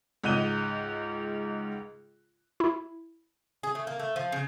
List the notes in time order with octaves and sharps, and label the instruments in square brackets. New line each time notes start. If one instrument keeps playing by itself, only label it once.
[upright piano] C#2 G#2 D#5 F#6 D#7 G7
[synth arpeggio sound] E4
[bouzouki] G#4
A3
A#3
A3
F3
C#3